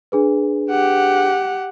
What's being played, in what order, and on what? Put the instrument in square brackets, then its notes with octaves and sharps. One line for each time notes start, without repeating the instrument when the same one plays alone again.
[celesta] D4 G#4 B4
[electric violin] G4 F#5